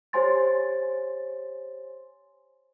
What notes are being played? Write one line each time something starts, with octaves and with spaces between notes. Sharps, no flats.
G4 C5 C#5 G#5 C6 A6